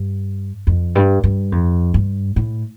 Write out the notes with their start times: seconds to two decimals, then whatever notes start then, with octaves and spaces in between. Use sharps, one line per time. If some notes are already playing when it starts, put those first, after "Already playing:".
Already playing: G2
0.67 F2
0.95 G2
1.24 G2
1.52 F2
1.94 G2
2.36 A2